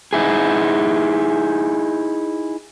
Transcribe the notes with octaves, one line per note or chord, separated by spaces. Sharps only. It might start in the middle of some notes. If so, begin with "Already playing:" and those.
D#4 E4 G#4